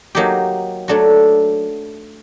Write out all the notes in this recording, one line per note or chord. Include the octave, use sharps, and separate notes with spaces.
F#3 A#3 D#4 G4
F#3 A3 D4 F#4